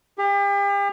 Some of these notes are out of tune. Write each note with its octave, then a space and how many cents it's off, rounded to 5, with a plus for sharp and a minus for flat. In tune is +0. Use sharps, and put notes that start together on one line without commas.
G4 +40